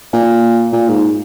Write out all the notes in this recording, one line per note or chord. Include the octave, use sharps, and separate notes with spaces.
A#2
A#2
G#2